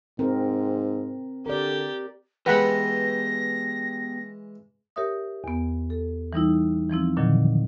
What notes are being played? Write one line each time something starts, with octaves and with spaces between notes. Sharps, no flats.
G#2 C4 A#4
D3 G4 A#4 D5
E3 G#3 B3 G4 B4 F#5 B5 A#6
G4 A#4 C#5 E5 D#6
E2 B3
A4
E3 G3 D#4 E4
E3 F3 C4 E4
A#2 D3 D#3 F3 F#3